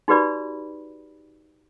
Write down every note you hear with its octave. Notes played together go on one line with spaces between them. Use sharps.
D#4 F#4 G4 B4 D5 B5